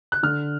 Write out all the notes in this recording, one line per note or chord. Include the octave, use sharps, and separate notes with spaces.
F#6
D3 F6